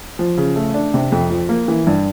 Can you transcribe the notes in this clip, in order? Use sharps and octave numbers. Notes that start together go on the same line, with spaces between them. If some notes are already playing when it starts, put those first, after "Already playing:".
F3
C#3
A3
D4
C3
F2
F3
A#3
E3
G2